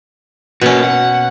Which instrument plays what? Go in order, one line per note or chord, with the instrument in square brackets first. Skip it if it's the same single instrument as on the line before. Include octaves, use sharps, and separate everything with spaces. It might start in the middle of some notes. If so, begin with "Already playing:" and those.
[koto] B2 C#4 [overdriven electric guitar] A#3 F#4
[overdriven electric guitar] F#5